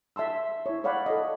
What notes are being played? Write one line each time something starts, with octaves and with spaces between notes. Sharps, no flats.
E5 A5 C6 E6
E4 C#5
C#5 D5 F5 F#5 B5
A4 D#5